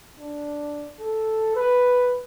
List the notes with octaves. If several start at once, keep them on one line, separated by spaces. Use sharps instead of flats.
D4
A4
B4